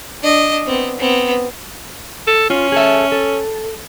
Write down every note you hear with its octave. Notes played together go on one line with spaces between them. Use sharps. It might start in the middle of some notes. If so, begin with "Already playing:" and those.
D4 D#5
B3 C4
B3 C4
A4
C#4 F4
G#4 A4 E5
A4